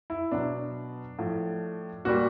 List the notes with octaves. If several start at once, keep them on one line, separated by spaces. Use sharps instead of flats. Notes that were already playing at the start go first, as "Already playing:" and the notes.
E4
B2 F#3 D4
A2 F3
A#2 G3 F#4